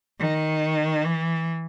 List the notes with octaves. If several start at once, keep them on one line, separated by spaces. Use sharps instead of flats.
D#3
E3